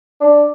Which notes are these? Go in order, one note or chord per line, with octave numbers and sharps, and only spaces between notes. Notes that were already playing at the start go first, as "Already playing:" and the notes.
D4